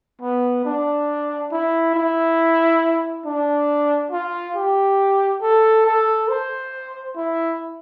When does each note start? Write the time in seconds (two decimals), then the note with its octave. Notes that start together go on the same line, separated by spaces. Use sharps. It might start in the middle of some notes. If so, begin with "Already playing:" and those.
0.22 B3
0.65 D4
1.51 E4
1.95 E4
3.25 D4
4.12 F4
4.56 G4
5.42 A4
5.86 A4
6.29 C5
7.16 E4